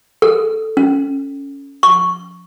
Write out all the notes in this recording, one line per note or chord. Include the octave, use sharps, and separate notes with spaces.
A4
C#4
C#6